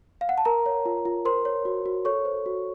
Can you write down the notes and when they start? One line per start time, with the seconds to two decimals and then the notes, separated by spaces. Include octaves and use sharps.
0.21 F5
0.29 F#5
0.38 A5
0.45 A#4 A#5
0.66 C#5
0.86 F4
1.05 F4
1.25 A#4 C5 C6
1.45 C#5
1.65 F#4
1.86 F#4
2.05 A4 C#5 C#6
2.25 C5
2.46 F#4